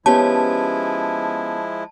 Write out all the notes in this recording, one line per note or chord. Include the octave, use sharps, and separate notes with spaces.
F3 G#3 B3 C#4 E4 G4 A5